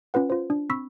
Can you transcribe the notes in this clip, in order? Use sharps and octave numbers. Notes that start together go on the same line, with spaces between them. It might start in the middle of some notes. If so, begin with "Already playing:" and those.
C#4 F4 B4 F#5
F4 C5
D4
C4 B5 C#6 E6 B6